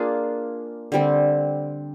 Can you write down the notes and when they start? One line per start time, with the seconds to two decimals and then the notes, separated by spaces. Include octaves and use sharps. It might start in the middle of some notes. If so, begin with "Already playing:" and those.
Already playing: A#3 D4 F4 G#4
0.92 D3 G3 C4